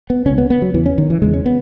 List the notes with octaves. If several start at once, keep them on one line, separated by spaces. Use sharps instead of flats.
B3
C#2 C#3 C#4
B3
B3
F#3
E2 C#3 E3
C#4
D#3
E3
E2 C#3 G#3
C#4
B3